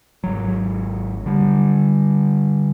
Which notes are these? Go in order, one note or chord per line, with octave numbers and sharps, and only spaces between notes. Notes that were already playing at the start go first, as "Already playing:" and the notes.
G#1 F#3
D3 G3